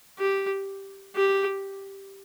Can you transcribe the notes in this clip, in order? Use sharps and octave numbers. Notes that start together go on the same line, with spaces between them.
G4
G4